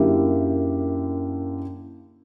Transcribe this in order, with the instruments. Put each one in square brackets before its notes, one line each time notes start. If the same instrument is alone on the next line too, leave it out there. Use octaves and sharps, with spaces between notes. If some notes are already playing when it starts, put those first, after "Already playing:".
Already playing: [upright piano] F#2 D3 A#3 E4 G4